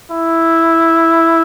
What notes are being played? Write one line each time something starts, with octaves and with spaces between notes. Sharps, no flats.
E4